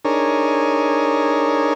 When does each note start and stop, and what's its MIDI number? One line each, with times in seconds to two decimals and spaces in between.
0.05 1.74 62
0.05 1.74 63
0.05 1.74 68
0.05 1.74 70
0.05 1.74 73